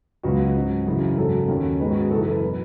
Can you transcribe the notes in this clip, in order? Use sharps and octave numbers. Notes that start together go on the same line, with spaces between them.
C#2 C#3 F#3 B3 F#4
G#2 F#3 C#4
F#2 C#3 E3
G#1 F#2 C#3 F#3 C#4 A4
D#2 D#3 F#3 C#4
G#2 D#3 G#3 C#4 B4
F#4
G#4
F#1 F#2 E3 A4
A4
B4
B2 F#3 B4